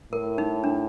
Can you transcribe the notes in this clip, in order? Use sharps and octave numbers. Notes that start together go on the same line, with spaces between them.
A2 A#4
D#4
D4